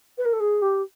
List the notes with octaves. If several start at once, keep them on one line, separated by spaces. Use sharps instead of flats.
B4
A#4
A4
G#4
G4